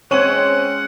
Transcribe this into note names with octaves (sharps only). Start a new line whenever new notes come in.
G#3 C4 C#4 C#5 F#5 D#7 F#7